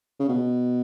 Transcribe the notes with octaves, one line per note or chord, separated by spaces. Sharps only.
C#3
B2